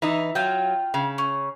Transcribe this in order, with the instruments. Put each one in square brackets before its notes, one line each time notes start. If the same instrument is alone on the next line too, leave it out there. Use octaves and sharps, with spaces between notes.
[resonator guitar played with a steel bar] E3 D#4
[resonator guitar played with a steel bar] F#3 [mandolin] F4 G5
[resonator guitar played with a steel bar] C#3
[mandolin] C#4